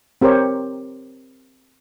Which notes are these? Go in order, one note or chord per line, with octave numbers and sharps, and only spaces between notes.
C4 G4 A#4 C5 C#5